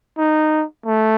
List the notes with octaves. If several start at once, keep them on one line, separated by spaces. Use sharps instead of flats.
D#4
A3